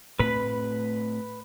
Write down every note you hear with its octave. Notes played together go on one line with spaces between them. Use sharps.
A2 A3 C4 B4 B5